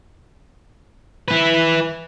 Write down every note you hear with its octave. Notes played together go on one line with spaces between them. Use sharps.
E4 B4